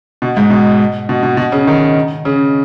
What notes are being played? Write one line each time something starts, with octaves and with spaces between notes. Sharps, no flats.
B2
G#2
B2
B2
B2
B2
C#3
D#3
C#3